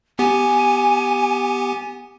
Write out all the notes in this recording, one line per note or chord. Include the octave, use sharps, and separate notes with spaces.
B3 G4 G#5